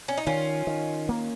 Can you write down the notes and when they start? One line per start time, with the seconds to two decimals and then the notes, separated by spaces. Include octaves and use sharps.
0.08 C#4
0.17 D#4
0.27 D#3 C#4 F4
0.67 D#3
1.09 A#3